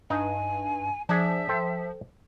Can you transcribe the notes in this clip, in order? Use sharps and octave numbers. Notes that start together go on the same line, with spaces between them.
G2 D#4 G#5
F3 D4 G#4 E5
A4 C5 G5